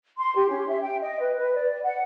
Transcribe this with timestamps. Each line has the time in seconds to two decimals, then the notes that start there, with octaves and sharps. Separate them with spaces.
0.18 C6
0.34 G4
0.48 C#4
0.68 E5
0.81 G5
1.01 D#5
1.20 B4
1.36 B4
1.55 D5
1.83 F#5